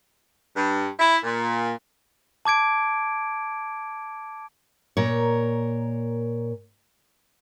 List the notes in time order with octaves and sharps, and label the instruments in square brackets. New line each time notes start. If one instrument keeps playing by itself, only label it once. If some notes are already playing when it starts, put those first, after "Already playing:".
[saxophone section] G2
E4
A#2
[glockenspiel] A5 D6 G#6 D7
[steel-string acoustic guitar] A#2 A#4 C#5